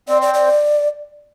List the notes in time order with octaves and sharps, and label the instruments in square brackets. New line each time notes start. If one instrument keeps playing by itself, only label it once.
[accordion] C4 [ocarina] D5
[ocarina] D5
D5